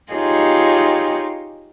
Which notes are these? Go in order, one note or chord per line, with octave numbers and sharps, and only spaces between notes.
D#4 F4 G4 G#4 C#5